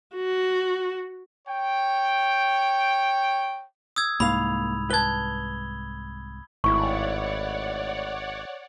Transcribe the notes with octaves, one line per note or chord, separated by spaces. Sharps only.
F#4
C#5 G5
D#6 E6 G#6
C2 G#2 A#3 F5 B5 F7
B4 A5 G#6 G7
G#1 A2 E4 C#5 D5 F#5 C#6